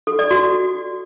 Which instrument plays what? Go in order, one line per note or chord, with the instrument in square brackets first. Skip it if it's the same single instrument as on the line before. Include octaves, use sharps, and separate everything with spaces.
[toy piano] A4
D5
F#4